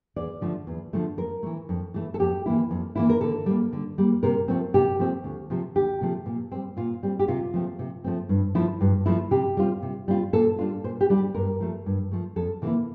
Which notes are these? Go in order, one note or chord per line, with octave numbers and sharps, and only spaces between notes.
E2 D5
D3 F3 A3
E2
D3 F3 A3
F2 A#4
E3 A3
F2
E3 A3
A4
F2 G4
E3 A#3 E4
F2
E3 A#3 E4
A#4
D3 A4
G3 A#3
D3
G3 A#3
C3 A#4
F3 A3 C4
C3 G4
F3 A3 C4
D2
C3 F3 A3
D2 G4
C3 F3 A3
A#2
G3 C4
A#2 F4
G3 C4
G4
C3 F4
F3 A3 C4
C3
F3 A3 C4
G2
F3 A3 E4
G2
F3 A3 E4
C3 G4
G3 C4 F4
C3
G3 C4 F4
A#2 A4
G3 D4 F4
A#2 C5
G4
G3 D4 F4
G4
G2 A#4
F3 A3
G2
F3 A3
F2 A4
C3 E3 A#3 E4